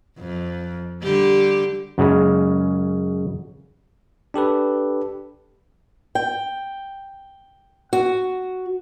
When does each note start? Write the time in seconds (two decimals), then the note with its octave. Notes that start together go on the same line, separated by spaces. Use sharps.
0.19 F2
1.02 D3 G3 G4
1.98 F#2 C#3 G#3
4.34 D4 G4 A4 B4
6.15 G5
7.93 F#4